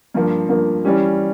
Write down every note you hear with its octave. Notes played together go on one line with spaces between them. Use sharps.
G2 F3 A#3
G2 F3 A#3
E3 G3 C#4 G4